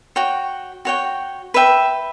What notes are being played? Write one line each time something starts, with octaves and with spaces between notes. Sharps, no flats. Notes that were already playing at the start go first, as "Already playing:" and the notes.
F#4 C#5 G5
F#4 C#5 G5
B4 E5 G5